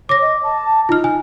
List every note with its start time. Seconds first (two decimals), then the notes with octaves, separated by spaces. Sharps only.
0.09 C#5 D6 A#6
0.21 D#5
0.43 A5
0.89 D#4 F4 F6
1.04 G#5